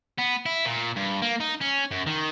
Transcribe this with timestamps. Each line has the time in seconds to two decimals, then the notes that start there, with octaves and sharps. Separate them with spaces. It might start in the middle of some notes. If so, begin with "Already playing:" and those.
0.19 B3
0.46 E4
0.66 A#2
0.97 G2
1.22 A#3
1.40 D#4
1.61 C#4
1.91 F#2
2.07 D#3